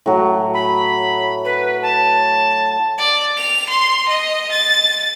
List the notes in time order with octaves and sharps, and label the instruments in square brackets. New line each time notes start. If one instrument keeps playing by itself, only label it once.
[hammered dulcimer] A2 F#3
[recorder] B5
B4
A5
[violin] D5
F7
C6
D#5
A6